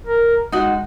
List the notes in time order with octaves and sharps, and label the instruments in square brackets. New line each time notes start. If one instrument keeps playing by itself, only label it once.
[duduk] A#4
[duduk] G#3 [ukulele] D#4 F#4